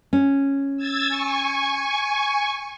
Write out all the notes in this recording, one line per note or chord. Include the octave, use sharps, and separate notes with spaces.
C#4
E6 G#6 A6
G#5 C#6